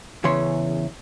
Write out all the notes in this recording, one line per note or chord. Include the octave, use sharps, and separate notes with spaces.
E2 C#3 E3 C#4 C#5 C6